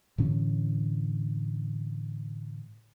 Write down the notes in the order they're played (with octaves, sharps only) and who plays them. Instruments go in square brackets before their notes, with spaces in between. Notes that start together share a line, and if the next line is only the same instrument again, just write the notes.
[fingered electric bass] A2 D3 E3 C#4